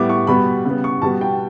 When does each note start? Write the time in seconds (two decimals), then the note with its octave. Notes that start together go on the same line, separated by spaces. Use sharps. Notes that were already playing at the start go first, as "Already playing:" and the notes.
Already playing: A2 G3 B3 D6
0.09 C#6
0.27 B2 G3 B3 B5
0.65 C#3 G3 B3
0.84 C#6
1.02 B2 G3 B3 A5
1.21 G5